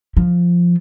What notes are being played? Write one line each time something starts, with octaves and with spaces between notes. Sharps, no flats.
F3